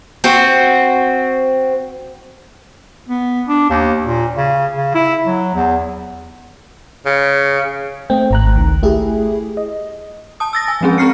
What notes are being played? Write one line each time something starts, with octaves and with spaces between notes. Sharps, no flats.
C4 F#4
B3
D4
D#2
A#2
C#3
C#3
E4
F#3
E2
C#3
A3 C4 G5
G#1 A#5 F#6
C#2 D#3
A3 E4 G4 G#4
D#5
A5 D#6
E6 A6 A#6
G#5
F3 G#3 C4 C#4 G#4
C4 A#5 C#6 F6 C7 C#7